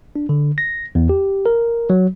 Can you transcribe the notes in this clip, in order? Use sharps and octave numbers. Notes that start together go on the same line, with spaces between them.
D4
D3
A#6
E2
G4
A#4
F#3